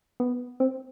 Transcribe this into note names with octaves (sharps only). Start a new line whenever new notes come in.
B3
C4